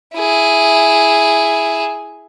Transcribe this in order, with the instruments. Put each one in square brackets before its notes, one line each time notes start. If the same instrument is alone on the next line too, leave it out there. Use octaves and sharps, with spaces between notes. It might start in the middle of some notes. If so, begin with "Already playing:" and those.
[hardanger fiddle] E4 G#4